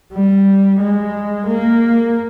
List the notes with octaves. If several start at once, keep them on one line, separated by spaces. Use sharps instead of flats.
G3
G#3
A#3